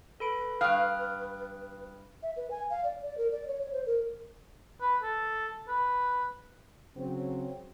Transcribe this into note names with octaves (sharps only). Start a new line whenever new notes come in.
A4 B4 B5 D7
G2 F5 G5 D#6 F#6
E5
B4
G#5
F5
D5
D5
A#4
D5
C#5
C#5
C5
A#4
B4
A4
B4
C#3 F#3 C4